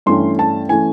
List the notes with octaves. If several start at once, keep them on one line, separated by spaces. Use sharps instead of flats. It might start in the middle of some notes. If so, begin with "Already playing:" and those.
G2 E3 A3 C#4 C6
A5
E3 A3 C#4 G#5